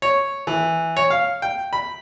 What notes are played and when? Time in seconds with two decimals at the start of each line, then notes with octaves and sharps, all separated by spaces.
0.02 C#5
0.47 E3
0.97 C#5
1.10 F5
1.42 G5
1.73 B5